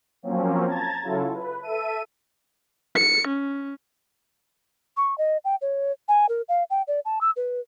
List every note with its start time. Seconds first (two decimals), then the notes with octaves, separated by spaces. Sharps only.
0.23 F3 F#3 A#3 C4 C#4
0.66 A5 A#5 G#6 A6
1.02 C#3 F#3 E4 F4 A4
1.33 B4
1.62 A4 E5 D#7
2.95 C#7
3.27 C#4
4.97 C#6
5.18 D#5
5.45 G5
5.62 C#5
6.08 G#5
6.29 A#4
6.49 F5
6.70 G5
6.88 D5
7.05 A5
7.21 E6
7.37 B4